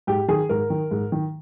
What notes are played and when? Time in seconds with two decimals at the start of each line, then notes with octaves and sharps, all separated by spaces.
0.07 G#2 G4
0.28 D#3 G#4
0.49 G#2 A#4
0.70 D#3
0.91 G#2
1.12 D#3